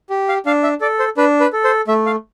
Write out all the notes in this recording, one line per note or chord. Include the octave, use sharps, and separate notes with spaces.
G4
F5
D4 F5
E5
A4 D5
C5
D4 B4
B4
A4
C5
A3 E5
F5